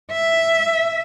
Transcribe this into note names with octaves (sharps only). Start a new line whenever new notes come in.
E5